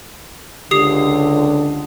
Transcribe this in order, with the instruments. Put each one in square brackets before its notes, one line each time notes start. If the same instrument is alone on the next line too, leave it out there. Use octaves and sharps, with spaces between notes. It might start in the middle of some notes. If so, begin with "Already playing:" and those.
[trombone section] C#2 D3 [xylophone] G4 D#6 C7